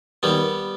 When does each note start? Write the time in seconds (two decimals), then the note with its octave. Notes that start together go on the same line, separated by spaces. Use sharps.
0.23 D#2 G3 B3